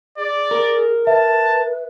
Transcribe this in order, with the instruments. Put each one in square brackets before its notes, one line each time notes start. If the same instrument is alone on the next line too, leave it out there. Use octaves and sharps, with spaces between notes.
[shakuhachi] G#4 [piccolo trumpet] D5
[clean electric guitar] A#4
[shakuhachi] B4 [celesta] E5 [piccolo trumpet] A5